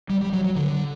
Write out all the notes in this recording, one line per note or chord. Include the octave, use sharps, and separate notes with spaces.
G3
G3
F#3
F#3
D3